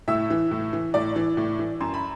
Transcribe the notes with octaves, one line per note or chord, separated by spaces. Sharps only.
A2 E5 E6
E3
A2
E3
A2 D5 D6
E3
A2
E3
F#2 C6
B5